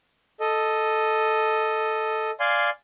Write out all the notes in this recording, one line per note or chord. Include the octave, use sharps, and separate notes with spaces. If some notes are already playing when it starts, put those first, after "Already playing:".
A4 D#5
D5 F5 G#5 C6